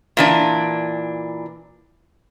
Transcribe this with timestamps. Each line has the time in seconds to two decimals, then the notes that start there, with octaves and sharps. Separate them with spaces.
0.17 A#2 E3 D4